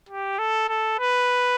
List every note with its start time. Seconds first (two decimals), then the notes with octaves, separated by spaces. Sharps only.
0.09 G4
0.39 A4
0.69 A4
1.00 B4